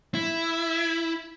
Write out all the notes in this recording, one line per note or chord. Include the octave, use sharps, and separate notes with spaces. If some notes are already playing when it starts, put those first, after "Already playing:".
E4